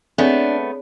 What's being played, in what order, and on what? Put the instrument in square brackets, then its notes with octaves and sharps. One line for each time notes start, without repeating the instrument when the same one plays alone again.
[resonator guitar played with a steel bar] A3 B3 [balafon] C4 [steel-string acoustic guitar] D4 [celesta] G#4 C#5